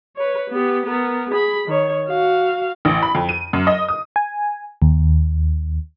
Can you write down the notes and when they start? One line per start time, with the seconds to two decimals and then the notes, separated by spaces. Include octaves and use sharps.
0.16 B4 C#5
0.51 B3 G4
0.86 B3 A#4
1.31 G#4 B5
1.68 D#3 C#5
2.09 F#4 F5
2.85 A1
3.02 B5
3.15 F2
3.29 D#7
3.53 F#2
3.67 D#5
3.88 D#6
4.16 G#5
4.82 D#2